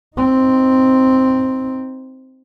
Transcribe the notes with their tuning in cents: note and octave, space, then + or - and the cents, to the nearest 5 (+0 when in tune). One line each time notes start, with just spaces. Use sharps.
C4 +0 D#4 +10